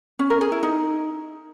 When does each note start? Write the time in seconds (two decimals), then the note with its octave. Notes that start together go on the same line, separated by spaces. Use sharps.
0.19 C#4
0.30 A#4
0.41 G#4
0.52 E4
0.63 D#4